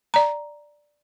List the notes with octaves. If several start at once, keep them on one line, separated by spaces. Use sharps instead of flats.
D5 A#5